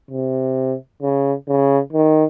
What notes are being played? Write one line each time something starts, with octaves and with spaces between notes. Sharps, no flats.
C3
C#3
C#3
D#3